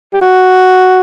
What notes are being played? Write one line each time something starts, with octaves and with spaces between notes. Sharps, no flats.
G4
F#4